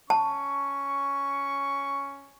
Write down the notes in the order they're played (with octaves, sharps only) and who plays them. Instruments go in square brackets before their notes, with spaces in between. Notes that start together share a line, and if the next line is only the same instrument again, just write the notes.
[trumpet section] C#4 C#6 [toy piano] A5